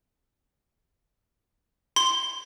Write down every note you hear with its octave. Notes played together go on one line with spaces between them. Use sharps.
C6